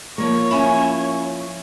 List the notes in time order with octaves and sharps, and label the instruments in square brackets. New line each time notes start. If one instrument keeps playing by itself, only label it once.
[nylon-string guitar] F3 A#3 [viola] C#5
[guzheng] C#4 E4